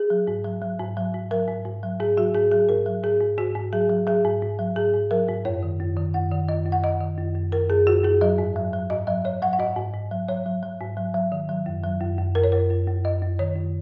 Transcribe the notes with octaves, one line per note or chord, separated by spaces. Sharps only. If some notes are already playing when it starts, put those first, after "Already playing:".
Already playing: G#4
F#3
G#2
F#3
F#3
G#2
F#3
G#2
F#3 A#4
G#2
G#2
F#3
G#2 G#4
F#3 F#4
G#2 G#4
F#3 G#4
G#2 A#4
F#3
G#2 G#4
G#2
G#2 F#4
G#2
F#3 G#4
F#3
F#3 G#4
G#2
G#2
F#3
G#2 G#4
G#2
F#3 A#4
G#2
F#2 C#5
D#3
F#2
D#3
F#2 F#5
D#3
F#2 D#5
F#2
F#5
F#2 D#5
D#3
F#2
F#2
F#2 A#4
F#2 G#4
F#2 F#4
F#2 G#4
F#3 D#5
G#2
F#3
F#3
G#2 D#5
F#3 D#5
F#3 C#5
F#3 F#5
F#5
G#2 D#5
G#2
G#2
F#3
F#3 C#5
F#3
F#3
G#2
F#3
F#3
D#3
F#3
F#2
F#3
F#2
F#2
F#2 A#4
C#5
F#2 A#4
F#2
F#2
F#2 D#5
F#2
D#3 C#5
F#2